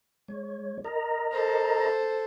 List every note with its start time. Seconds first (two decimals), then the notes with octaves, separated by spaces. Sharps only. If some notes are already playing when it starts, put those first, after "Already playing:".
0.28 G#3 C#5
0.84 A#4 D#5 A#5
1.32 A4 C5